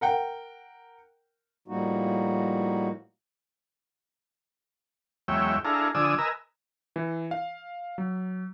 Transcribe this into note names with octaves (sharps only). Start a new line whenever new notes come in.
A#4 F#5 G5
A2 F3 G3 A#3 D#4 F#4
E2 F#3 G#3 C#5 E5 G5
D4 E4 G#4 A4 F5 A#5
D3 F3 D5 G#5 D#6 E6
A#4 B4 D#5 G#5 A#5 E6
E3
F5
F#3